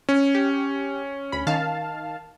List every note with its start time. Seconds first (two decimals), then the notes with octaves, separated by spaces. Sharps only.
0.09 C#4
0.35 G4
1.32 D2 B5
1.47 D#3 F5 A5